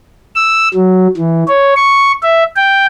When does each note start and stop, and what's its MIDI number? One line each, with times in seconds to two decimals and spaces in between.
0.35 0.68 88
0.74 1.07 54
1.17 1.44 52
1.47 1.73 73
1.77 2.12 85
2.22 2.43 76
2.56 2.86 79